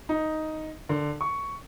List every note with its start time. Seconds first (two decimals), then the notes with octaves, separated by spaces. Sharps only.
0.09 D#4
0.89 D3
1.21 C#6